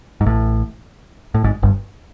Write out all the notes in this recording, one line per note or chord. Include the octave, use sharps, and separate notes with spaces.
G#2
A1 A2
A2
G#1 G#2
G1 G2